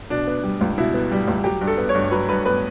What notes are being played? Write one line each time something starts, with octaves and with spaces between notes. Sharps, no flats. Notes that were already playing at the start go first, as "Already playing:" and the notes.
B2 D4
B3
G3
C#2
B2 E4
B3
G3
C#2
F#3 G4
G2
A4
B3
C#5
G2
F#3 B4
G2 B4
B3 B4